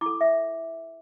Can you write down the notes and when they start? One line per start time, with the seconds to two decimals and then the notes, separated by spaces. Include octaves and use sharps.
0.01 E4 D6
0.06 A4
0.21 E5